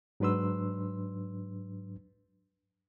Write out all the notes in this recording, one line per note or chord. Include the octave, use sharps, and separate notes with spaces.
G#2 F#3 D4 B4 C6 E6